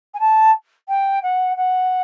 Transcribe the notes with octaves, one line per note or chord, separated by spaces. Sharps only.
G#5
A5
G5
F#5
F#5